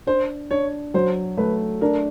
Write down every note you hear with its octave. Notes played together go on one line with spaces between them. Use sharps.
D4 C5
D4 C#5
F#3 C5
A3 B4
D4 A#4